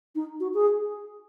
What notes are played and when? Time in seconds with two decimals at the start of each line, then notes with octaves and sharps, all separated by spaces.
0.15 D#4
0.40 F#4
0.54 G#4